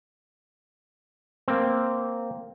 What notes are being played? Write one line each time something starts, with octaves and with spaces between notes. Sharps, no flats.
A#3 C4